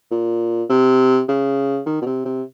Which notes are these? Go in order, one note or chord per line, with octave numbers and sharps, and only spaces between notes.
A#2
C3
C#3
D#3
B2
C3
C3